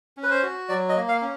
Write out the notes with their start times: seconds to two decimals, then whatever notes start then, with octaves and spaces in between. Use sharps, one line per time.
0.17 C#4
0.23 B4
0.30 C5
0.43 F#4
0.69 F#3 D5
0.89 D#5
0.96 A#3
1.08 F5
1.22 C#4